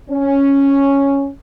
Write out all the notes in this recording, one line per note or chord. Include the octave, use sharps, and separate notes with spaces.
C#4